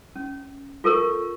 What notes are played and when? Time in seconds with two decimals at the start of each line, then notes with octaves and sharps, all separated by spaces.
0.16 C#4
0.84 F4 A4 A#4 C#6